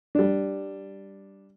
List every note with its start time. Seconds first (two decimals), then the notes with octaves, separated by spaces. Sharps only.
0.15 G3 D4